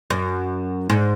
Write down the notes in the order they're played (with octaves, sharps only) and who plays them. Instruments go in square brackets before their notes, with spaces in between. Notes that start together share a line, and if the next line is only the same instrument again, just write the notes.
[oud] F#2
G#2